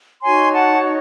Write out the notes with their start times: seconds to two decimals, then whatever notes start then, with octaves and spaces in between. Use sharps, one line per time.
0.23 D#4 F#4 C#5 G#5 C6
0.53 F#5 A5